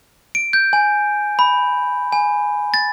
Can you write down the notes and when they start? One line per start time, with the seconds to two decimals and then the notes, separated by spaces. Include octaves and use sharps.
0.35 D7
0.53 G6
0.73 G#5
1.39 B5
2.13 G#5
2.74 A6